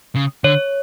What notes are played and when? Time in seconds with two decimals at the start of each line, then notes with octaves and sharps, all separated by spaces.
0.15 C#3
0.44 D3 C#5